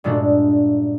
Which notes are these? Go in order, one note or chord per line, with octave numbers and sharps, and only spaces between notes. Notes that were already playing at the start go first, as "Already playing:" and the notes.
G2 A#2 G#3 A3 D4 F#4